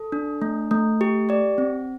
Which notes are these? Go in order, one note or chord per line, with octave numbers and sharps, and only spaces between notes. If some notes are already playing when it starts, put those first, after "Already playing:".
Already playing: A4
D4
A3
A3
G4
G4 D5
C4